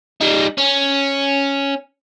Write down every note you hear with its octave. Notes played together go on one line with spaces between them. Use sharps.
G3 D#4
C#4